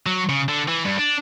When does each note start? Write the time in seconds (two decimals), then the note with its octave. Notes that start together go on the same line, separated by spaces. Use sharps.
0.06 F#3
0.29 C#3
0.48 D3
0.68 E3
0.85 G2
0.98 D4